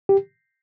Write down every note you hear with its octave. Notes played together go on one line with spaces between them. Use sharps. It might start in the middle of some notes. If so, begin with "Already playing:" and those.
G4